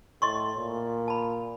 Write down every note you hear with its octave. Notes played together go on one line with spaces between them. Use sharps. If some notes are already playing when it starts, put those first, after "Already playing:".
A2 D#5 C6 C#6
A#2
A5 B5